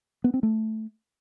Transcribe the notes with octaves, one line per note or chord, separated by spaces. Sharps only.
B3
C4
A3